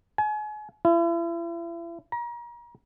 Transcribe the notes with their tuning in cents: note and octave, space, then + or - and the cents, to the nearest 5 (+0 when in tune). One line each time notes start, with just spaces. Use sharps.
G#5 +35
E4 +40
A#5 +35